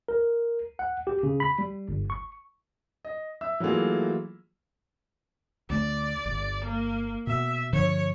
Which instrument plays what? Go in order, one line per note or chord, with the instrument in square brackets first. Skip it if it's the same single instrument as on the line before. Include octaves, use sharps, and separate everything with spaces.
[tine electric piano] A#4
F#5
G4
C#3
B5
G3
G1
C#6
[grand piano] D#5
E5 E6
E3 F#3 A3 A#3 F4 G#4
[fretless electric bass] D2 A3 [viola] D5
[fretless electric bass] G1
[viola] A#3
[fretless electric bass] B2 [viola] E5
[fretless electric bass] G2 D3 F3 [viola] C#5